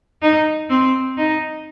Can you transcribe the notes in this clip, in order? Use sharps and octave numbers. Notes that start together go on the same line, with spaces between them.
D#4
C4
D#4